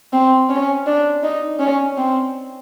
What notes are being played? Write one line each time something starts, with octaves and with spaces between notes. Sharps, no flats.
C4
C#4
D4
D#4
C#4
C4